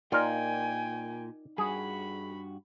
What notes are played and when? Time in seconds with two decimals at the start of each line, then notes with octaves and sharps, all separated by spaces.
0.12 A#2 D#4 F4 A#4 D5 G5 G#5
1.58 G2 F#4 G#4 B5